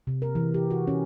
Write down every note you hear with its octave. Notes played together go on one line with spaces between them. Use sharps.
C3
A#4
E3
G4
F#4
C#4